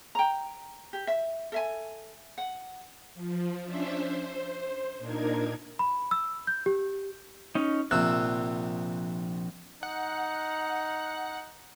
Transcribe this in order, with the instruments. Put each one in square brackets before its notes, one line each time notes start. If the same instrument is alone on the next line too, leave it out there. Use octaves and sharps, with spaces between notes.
[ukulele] G5 A#5
G4
E5
A4 E5 G#5
F#5
[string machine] F3
C#4 D4 C5 E5
C5
A#2 D4 D#4 A#4 G#6
[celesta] B5
E6
G6
G4
[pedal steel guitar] C#4 D#4
[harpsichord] A#1 C3 [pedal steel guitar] E6 F#6
[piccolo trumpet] D#4 [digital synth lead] F#5